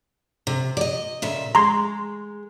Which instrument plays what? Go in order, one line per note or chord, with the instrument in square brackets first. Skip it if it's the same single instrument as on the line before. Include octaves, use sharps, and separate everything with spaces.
[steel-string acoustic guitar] C3
D5 D#5
A#2 C#3 E5
[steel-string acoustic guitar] G#3 [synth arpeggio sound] A#5 C6 G#6